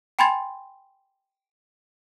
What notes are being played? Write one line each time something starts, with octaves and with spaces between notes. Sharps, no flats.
G5 G#5 B5 C6 G#6 A6